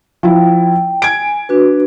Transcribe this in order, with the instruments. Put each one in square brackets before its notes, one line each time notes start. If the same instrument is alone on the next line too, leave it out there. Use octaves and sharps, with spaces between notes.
[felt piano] F3 E4 [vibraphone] G5
[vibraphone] G#5 [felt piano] G#6 D7
[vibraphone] D4 F#4 B4